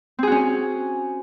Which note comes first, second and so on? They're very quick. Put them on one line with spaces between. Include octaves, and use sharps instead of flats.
C4 G#4 F#4 C#4